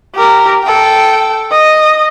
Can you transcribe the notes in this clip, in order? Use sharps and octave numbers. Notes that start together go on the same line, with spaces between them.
G4 A#4
A4 G5
D#5